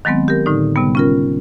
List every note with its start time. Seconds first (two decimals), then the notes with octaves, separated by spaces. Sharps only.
0.05 D#3 F#3 G#3 B3 C4
0.28 G4 A#4
0.46 A2 D3 D#4
0.76 C3 G3 B3
0.95 C#4 F4 A#4